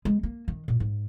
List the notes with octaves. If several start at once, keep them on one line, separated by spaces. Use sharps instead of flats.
G#3
A#3
D#3
A#2
G#2